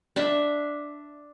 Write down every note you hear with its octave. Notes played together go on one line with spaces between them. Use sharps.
D4 E5